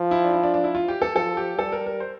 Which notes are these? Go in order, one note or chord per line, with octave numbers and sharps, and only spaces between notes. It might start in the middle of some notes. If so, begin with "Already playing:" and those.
Already playing: F3
E4
D4
E4
D4
D4
E4
F4
G4
A4
F3 A4
G4
G3 A4
A#4
A#4
C5